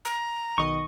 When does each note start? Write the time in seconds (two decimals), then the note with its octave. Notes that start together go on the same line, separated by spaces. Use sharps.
0.05 A#5
0.58 B1 D#3 D#5 C#6